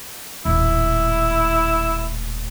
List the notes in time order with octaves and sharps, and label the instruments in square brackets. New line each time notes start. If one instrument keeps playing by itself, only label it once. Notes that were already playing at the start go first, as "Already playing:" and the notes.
[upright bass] D#1 A2 [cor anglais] E4